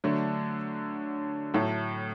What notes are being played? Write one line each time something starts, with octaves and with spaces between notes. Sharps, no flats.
D3 F#3 A3 D4
A2 F#3 A3